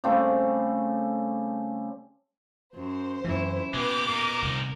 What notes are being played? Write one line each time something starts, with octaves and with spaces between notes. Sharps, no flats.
C#3 G3 A3 C4
F#2 C5
F#2 E3 C#4 E4
B2 G#3 B3 G4 B4 D6
A#2 D#4 A#4
C2